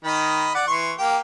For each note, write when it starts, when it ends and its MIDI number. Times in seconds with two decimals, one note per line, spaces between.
0.04 0.50 51
0.04 0.50 75
0.04 0.50 83
0.55 0.66 74
0.55 0.66 78
0.67 0.92 52
0.67 0.92 84
0.67 0.92 85
0.98 1.17 58
0.98 1.17 67
0.98 1.17 79